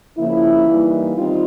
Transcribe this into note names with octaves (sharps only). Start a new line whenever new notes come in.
C#3 F3 A#3 E4
E3 G3 A#3 D#4
D#3 G3 C4 D#4 F4